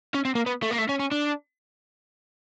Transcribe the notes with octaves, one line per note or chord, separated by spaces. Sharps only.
C#4
C4
A#3
B3
A3
A#3
A3
C#4
C#4
D4